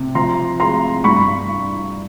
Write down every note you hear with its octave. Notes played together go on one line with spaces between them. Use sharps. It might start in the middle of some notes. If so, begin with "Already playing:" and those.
Already playing: C3
F3 A#5 C6
G#3 A#5 C6
G2 B5 C#6